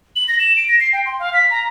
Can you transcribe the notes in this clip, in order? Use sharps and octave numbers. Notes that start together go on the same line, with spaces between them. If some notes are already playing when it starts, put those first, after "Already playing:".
F#7
A#6
E7
D7
A#6
C7
G5
C6
F5
B6
A#5